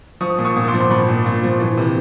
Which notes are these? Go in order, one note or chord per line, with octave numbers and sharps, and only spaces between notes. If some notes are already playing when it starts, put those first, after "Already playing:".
F3 C#6 D#6
A#2
C#6 D#6
A#2
C6 D6
F3
C6
F3 B5 C#6
A#2
A#2
F3
E3
C3